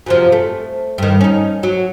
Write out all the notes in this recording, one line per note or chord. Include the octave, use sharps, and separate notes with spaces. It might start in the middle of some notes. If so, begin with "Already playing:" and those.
F#2 C3 F3
A3
G2 D#3
C#4 D#4
F#3